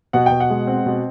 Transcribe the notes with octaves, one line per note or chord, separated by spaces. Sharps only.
B2 F#5
B2 G5
F#5
G#3
C4
B2